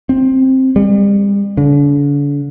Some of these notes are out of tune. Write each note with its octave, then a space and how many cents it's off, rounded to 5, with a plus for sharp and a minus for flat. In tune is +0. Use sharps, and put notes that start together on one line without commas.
C4 +10
G3 +40
D3 -40